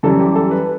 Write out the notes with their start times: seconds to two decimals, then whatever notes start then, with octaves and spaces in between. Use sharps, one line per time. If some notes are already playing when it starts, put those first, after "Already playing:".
0.03 F#2 E3 G3 A4
0.20 G4
0.35 A4
0.51 B4